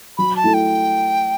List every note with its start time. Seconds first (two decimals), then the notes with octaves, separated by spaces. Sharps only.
0.18 F#3 B5
0.36 A5
0.44 A3 E4
0.54 G5